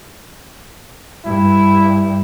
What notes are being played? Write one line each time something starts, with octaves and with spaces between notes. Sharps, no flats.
G2 E4